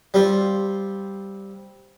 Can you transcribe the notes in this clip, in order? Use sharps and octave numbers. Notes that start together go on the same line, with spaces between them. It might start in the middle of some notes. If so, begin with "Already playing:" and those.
G3 C4 F4